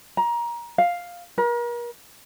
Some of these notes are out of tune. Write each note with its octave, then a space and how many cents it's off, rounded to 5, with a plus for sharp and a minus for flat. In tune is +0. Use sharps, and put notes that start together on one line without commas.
A#5 +20
F5 +5
A#4 +40